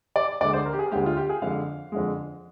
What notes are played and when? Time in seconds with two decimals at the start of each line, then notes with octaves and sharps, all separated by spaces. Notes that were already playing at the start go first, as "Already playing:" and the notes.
0.16 D5
0.41 D2 D3 G#3 D5
0.53 C5
0.66 A#4
0.73 G4
0.79 G#4
0.92 D2 D3 G#3 G4
1.06 F4
1.17 G4
1.29 G#4
1.42 F2 D3 G#3 F5
1.92 F2 D3 G#3